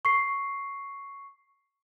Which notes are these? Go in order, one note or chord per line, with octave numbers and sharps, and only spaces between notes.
C#6 C7